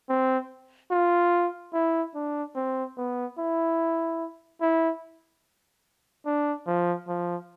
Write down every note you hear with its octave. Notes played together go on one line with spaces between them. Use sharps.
C4
F4
E4
D4
C4
B3
E4
E4
D4
F3
F3